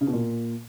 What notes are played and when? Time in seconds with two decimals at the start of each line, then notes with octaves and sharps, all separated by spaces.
0.01 C#3
0.07 B2
0.13 A#2